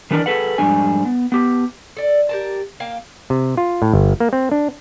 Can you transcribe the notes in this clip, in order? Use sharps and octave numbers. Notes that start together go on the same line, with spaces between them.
D#3 E3 D4 A#4 D5
G#4 A4 B4 F#5
F2 G#2 G3 D4 G#5
B3
B3 G4
A4 D5
G4 A#4 A5
A#3 F5 G5
C3
F4
A2
G1
A#3
C4
D4